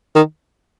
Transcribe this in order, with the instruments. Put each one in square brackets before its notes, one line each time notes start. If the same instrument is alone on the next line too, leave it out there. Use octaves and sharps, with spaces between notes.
[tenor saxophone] D#3